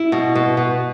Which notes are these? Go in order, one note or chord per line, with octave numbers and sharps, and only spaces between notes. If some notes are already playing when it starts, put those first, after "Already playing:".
Already playing: E4
B2
B2
B2